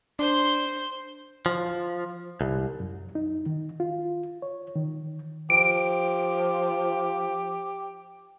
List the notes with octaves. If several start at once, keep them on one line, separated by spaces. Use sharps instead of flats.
D4 C5 C6
F3
C2
F#2
D#4
D#3
F4
C#5
D#3
F3 G4 D7